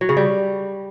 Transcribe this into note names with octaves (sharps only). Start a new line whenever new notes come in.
F#3
C#3
G3